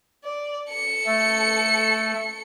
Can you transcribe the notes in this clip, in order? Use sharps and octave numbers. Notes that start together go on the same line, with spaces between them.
D5
A4 C#7
A3